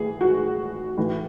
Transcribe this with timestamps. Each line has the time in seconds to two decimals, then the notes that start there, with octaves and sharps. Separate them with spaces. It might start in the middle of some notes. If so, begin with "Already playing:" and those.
Already playing: A2 E3 G#4
0.21 F#4
0.97 A2 E3